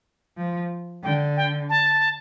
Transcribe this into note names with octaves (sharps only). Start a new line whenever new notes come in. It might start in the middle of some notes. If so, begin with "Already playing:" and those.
F3
D3 G5
G5
A5